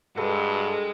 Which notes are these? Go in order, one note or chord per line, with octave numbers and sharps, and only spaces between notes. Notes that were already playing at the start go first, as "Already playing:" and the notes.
G2 G#3 F#4 A4 B4